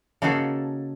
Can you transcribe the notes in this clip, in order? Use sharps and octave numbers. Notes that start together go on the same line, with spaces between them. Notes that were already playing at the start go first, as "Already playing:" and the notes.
C#3 A#3 D#4 F#4 G#4 A4